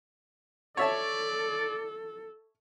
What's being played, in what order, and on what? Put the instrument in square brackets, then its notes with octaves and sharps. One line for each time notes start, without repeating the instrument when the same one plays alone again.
[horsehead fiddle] A4 [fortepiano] C#5 E5 A5 [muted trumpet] D5